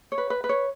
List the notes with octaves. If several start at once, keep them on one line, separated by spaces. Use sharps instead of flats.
C#5
B4
B4
B4
C#5